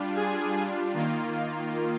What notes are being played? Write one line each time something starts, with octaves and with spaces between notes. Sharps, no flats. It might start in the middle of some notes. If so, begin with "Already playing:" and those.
Already playing: G3 D4 F4
G#4 G#5
D#3 A#3 F4